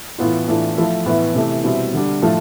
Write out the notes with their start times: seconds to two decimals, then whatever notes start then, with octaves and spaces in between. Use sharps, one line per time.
0.18 A2 E3 B3 F4
0.48 A2 E3 A3 D4 F4
0.77 F3 A3 E4
1.06 A2 E3 B3 E4
1.35 C3 E3 A3
1.64 B2 G3 C4 E4
1.93 D3 G3 D4
2.22 A2 F3 A3